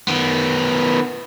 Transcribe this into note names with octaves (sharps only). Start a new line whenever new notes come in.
D#3 B3